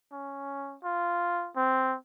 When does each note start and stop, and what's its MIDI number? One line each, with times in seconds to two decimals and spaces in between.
0.12 0.76 61
0.84 1.50 65
1.56 1.96 60